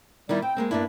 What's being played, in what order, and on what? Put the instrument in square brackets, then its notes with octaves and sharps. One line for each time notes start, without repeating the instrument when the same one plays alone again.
[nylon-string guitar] D#3 B3 E4 [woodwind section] G3 D5
[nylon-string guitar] C4 [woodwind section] G5
[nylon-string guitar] G#3 A#3 C4
[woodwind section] G2 D4 [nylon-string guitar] A#3 B3 E4